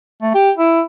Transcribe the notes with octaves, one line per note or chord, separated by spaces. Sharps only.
A3
G4
E4